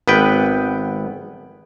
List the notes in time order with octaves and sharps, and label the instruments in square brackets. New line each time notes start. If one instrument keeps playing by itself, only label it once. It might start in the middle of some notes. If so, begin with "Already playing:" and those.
[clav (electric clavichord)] G#1 B3 B4 G5